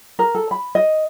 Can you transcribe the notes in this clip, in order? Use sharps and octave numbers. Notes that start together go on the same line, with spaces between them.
A#4
A4
B5
D#5